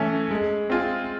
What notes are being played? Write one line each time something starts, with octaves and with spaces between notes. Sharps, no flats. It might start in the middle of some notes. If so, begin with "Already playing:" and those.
Already playing: E3 A3 C#4
G#3
C4 F4 G#4